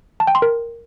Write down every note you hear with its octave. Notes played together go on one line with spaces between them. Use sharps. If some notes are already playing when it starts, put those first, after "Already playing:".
A5
G5
C6
A#4